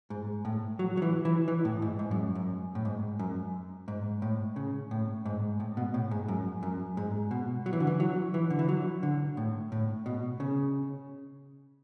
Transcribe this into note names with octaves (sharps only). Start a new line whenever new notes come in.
G#2
A2
F#3
F#3
E3
E3
E3
A2
G#2
G#2
F#2
F#2
A2
G#2
F#2
G#2
A2
C#3
A2
G#2
A2
B2
A2
G#2
F#2
F#2
G#2
B2
F#3
E3
D3
E3
F#3
E3
D3
E3
F#3
D3
A2
A2
B2
C#3